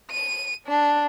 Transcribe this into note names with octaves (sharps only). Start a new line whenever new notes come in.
D#7
D4